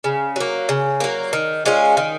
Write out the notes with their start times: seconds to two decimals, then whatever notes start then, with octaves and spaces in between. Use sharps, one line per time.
0.04 C#3
0.36 F#3 A#3
0.69 C#3
1.00 F#3 A#3
1.33 D#3
1.65 G#3 C#4 F4
1.97 D#3